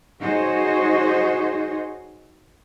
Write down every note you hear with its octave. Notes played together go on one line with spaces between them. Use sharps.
D#4 F#4 G#4 C5 C#5 D#5